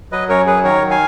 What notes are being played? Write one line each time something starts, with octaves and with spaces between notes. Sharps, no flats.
F#3 B4 D#5
F#2 A#4 C#5
F#3 G#4 B4
D#3 A#4 C#5
F#3
F5 G#5